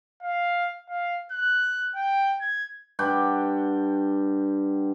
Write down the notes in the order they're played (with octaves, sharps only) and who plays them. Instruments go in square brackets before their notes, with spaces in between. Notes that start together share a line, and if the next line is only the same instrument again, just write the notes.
[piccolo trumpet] F5
F5
F#6
G5
G#6
[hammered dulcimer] G2 F#5 G5 D6